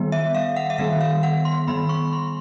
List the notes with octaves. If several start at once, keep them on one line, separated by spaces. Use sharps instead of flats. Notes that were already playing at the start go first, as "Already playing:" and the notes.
Already playing: D#3 G3 B3
E5
F5
F#5
E5
D#3 G3 B3 F5
F5
F#5
C6
D#3 G3 B3 B5
C#6
C6